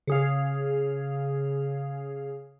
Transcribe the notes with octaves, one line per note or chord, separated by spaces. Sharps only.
C#3 G#4 F5